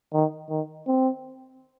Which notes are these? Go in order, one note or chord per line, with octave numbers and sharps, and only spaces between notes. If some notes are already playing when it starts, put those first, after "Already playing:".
D#3
D#3
C4